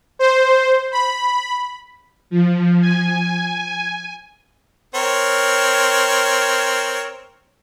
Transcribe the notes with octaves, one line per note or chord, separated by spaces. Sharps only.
C5
B5
F3
G#5
C4 A#4 C#5